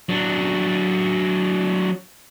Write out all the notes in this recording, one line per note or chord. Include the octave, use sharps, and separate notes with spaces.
F#3 D4